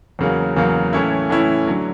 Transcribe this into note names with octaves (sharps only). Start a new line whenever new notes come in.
E2 C#3 F#3 A#3
E2 C#3 F#3 A#3
A2 E3 A3 C#4 E4
A2 E3 A3 C#4 E4
D3 F#3